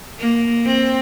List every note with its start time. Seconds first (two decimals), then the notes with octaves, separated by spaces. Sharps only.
0.19 A#3
0.65 C4